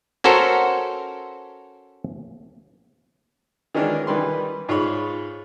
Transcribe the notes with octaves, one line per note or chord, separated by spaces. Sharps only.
C#4 F#4 A4 A#4 C5
D#3 E3 G#3 C#4 D4 A#4
D#3 E3 G3 B4 C6
G#2 F4 G#4 C#5 B5